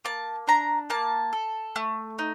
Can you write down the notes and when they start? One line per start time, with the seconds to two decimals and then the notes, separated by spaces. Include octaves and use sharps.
0.05 A#3 A5
0.47 D4 A#5
0.90 A#3 A5
1.33 A4
1.76 A3
2.19 D#4